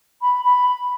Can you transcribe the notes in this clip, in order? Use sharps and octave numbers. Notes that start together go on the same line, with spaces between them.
B5
B5